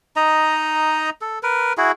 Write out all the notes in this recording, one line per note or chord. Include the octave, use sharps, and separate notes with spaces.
D#4 D#5 A#5
A4
A#4 B4
E4 F#4 G#4